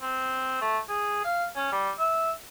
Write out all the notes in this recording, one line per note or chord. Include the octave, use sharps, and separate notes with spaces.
C4
A3
G#4
F5
C#4
G3
E5